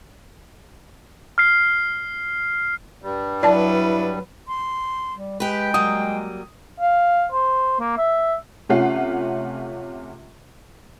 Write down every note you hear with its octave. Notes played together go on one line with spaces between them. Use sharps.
F6 C7
G2 G3
F#3 E4 B4 D5 A5
C6
G3
G#3 G4 B4 G5
F#3 G3 A#3 D#6
F5
C5
A#3
E5
C3 A3 C#4 F4 F#5 C7